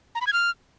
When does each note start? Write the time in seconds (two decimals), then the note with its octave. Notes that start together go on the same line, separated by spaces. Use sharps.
0.15 A#5
0.21 B5
0.27 G#6
0.33 F6